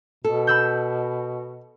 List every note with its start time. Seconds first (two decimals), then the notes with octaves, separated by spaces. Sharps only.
0.24 B2 A4
0.47 B5 E6 G6